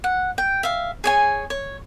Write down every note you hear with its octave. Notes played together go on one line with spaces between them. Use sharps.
F#5
G5
E5 F5
G#4 C#5 G#5
C#5